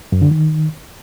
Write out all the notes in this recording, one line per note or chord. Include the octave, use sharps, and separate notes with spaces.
F#2
D3
D#3